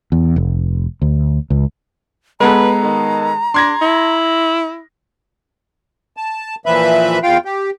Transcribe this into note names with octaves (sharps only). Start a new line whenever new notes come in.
E2
F1
D2
C#2
G#3 B3 A4 B4 A#5
D#3
D4 C6 G#6 A#6
E4
A5
A#2 E3 F3 B4 E5 B5
E2 F4 F5 G5
G4